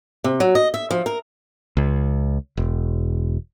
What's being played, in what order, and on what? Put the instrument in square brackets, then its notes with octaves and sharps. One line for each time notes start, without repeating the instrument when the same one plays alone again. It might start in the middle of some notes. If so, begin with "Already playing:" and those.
[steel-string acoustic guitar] C3
F#3
D#5
E5
F3
A#4
[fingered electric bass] C#2
E1